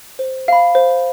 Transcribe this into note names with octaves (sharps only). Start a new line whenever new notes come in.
C5
F5 B5
C5